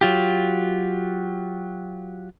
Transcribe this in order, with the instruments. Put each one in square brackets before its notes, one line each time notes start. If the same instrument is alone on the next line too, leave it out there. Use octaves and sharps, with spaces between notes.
[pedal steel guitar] F#3 F4 G4